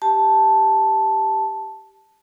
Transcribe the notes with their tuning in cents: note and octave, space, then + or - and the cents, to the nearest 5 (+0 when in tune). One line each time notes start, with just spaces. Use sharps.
G4 +0 A5 +0